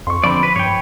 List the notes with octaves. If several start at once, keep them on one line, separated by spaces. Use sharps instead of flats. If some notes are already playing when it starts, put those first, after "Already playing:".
F2 C6 C#6
D3 F3 C4 D5 B5
B4
G2 C#5 G5